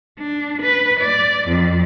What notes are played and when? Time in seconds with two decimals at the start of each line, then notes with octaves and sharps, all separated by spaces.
0.18 D4
0.62 B4
0.99 D5
1.47 F2